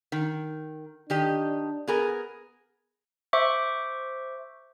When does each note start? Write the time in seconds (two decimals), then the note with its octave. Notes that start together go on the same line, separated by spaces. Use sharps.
0.12 D#3
1.10 D#3 D4 G4 D#5
1.87 B3 G#4 A#4
3.33 C5 E5 C#6 D6